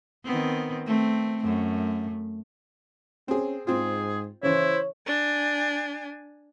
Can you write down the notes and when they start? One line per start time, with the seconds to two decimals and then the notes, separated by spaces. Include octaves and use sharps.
0.24 D#3 B3 C4
0.86 A3 C4
1.43 F#2 A3
3.28 C4 C#4 G#4
3.67 G#2 C4 F4 G#4
4.43 C#3 E3 E4 C5 C#5
5.07 D4 G#5